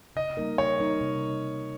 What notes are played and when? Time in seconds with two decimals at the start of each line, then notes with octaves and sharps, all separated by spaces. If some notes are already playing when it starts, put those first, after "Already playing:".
0.16 C#3 D#5
0.37 G3 A#3 D#4 A#4
0.58 C#3 C#5
0.80 G3 A#3 D#4 A#4
1.01 C3